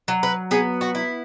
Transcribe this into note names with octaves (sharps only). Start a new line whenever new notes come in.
F#3
B4
B3 G#4
F#4
E4